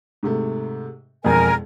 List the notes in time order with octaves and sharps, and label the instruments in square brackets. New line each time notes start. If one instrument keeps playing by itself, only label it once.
[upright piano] G#2 C3 A3
[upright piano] E1 F2 [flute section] A#4 G#5